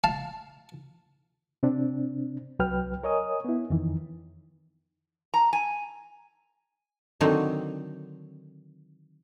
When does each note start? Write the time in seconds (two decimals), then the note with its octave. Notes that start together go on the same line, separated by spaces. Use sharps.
0.04 F5 A5
1.63 C3 C4 D4
2.59 C2 F#3 B4 G5 F6
3.04 A#4 C#5 D#5 G#5 D#6
3.45 B3 E4
3.70 F2 D#3 E3
5.34 A#5
5.53 G#5
7.21 D3 D#3 F#3 C4 D#4